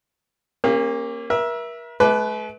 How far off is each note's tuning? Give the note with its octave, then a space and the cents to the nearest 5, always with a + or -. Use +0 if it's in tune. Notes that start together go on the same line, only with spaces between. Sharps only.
A#3 +0 C#4 -30 G4 +45
A#4 +40 E5 +0
A3 -45 B4 +0 D6 +0